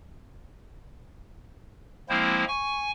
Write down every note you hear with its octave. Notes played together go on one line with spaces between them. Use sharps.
F3 G#3 A#3 C4 E4 C5
G#5 C#6